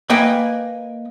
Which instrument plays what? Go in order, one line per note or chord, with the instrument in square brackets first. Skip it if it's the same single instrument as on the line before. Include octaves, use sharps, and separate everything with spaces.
[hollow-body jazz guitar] A#3 B4 D#5 G5 G#5